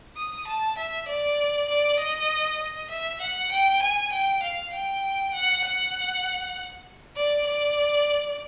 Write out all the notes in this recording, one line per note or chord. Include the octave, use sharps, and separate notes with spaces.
D#6
A5
E5
D5
D5
D#5
D#5
E5
F#5
G5
G#5
G5
F5
G5
F#5
F#5
D5
D5